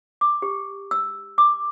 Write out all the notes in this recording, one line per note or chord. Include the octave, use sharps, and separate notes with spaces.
D6
G4
E6
D6